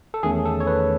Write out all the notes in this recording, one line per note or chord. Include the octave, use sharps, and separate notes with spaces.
A4
E2 D#3 A3 C#4 G#4
A4
C#5
B4